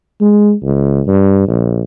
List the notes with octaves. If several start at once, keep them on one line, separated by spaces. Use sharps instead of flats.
G#3
C#2
G2
A#1